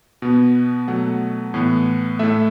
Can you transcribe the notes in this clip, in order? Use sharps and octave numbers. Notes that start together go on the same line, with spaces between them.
B2 B3
B2 F#3 A3 F#5
A2 E3 B3
A2 A3 E5